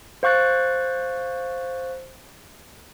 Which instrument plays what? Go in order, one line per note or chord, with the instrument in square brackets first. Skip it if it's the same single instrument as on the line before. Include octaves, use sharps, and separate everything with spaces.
[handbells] C5 F5 C#6 F#6 A6